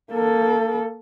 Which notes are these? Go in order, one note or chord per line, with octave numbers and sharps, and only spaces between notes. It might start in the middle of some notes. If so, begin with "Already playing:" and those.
A#3 A4